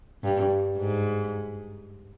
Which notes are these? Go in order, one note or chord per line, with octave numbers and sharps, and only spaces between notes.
G2
G#2